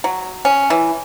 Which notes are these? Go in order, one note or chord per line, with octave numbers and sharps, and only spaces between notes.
F#3
C#4
E3